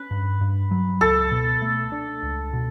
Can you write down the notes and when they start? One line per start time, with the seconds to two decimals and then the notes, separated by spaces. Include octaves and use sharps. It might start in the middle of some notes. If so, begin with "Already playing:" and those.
Already playing: C#4 B4
0.11 G2
0.41 G2
0.71 F#3
1.01 C#2 A4
1.31 B2
1.62 A3
1.92 D4
2.22 C#2
2.53 B2